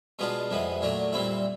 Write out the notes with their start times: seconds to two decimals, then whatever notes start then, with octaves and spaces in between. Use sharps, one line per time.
0.19 B2 G#3 B3 D4 F4
0.50 F2 C3 E3 G#3 B3
0.81 A#2 F#3 A3 D4
1.13 A#2 G3 C4 E4